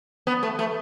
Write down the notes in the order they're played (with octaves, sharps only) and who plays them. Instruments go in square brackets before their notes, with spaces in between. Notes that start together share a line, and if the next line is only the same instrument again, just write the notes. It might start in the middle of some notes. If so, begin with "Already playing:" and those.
[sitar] B3
A3
A3